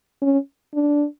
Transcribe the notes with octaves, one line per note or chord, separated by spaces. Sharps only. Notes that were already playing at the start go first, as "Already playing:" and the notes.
C#4
D4